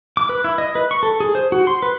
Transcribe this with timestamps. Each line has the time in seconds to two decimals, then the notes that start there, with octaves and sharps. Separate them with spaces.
0.17 D6
0.29 B4
0.44 E4
0.58 D#5
0.75 B4
0.91 C#6
1.03 A4
1.20 G#4
1.35 C5
1.52 F#4
1.67 C6
1.83 B4